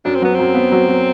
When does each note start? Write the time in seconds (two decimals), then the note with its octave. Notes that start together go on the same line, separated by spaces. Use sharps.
0.05 F#2 D4
0.15 C4
0.22 F#3 B3
0.35 F#2 C4
0.54 B3
0.72 F#3
0.88 F#3